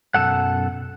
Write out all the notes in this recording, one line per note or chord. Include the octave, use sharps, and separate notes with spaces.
B1 F#2 A4 F#5